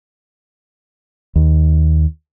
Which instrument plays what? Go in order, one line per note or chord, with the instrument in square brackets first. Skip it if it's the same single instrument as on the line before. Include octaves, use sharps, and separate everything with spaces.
[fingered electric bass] D#2